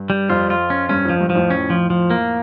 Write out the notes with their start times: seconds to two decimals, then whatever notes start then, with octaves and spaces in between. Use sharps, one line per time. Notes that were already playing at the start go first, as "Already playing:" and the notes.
Already playing: G2
0.10 G3
0.29 F2 F4
0.50 F4
0.70 C#4
0.89 G2 C#4
1.05 F2 F3
1.20 G2
1.30 F3
1.35 F2 A2
1.50 C#4
1.70 F3
1.90 F3
2.10 A#3